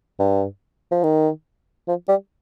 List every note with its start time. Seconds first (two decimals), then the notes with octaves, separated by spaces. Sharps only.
0.19 G2
0.92 F3
1.03 D#3
1.88 F3
2.08 G3